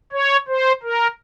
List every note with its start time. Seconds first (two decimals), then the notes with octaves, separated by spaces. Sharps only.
0.12 C#5
0.48 C5
0.83 A#4